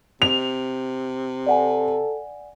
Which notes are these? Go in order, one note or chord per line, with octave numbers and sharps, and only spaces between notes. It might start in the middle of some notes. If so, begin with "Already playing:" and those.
C3 F7
A4 D5 F#5 G#5